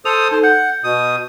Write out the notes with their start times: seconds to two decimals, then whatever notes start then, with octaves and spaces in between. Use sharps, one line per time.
0.05 A4 C5 D#6 F7
0.31 D#4 A4 C5
0.44 F#5 G6
0.84 B2 D#6